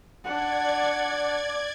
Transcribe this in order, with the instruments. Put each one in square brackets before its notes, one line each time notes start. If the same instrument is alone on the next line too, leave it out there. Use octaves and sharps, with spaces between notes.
[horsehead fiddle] D4 F#5 [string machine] D5 G#6